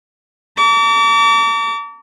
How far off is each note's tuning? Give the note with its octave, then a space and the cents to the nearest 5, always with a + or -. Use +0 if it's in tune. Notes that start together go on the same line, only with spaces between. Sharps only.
A#5 -45 D6 -40